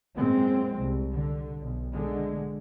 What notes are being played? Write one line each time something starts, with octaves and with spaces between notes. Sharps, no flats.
F#2 A#2 G#3 C4
C2
D3
B1
D3 G#3